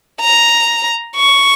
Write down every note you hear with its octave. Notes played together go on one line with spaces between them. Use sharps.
A#5
C#6